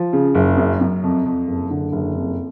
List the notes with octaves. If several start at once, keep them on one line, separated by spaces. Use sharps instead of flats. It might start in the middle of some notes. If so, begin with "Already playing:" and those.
Already playing: F3
C#3
F#1
F#2
F#2
F2
F2
F#1
D3
F#1
F2